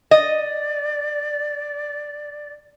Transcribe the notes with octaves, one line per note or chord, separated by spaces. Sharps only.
D5 D#5